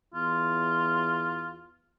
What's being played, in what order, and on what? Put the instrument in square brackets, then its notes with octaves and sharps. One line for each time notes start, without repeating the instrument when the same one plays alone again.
[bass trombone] E2 [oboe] F4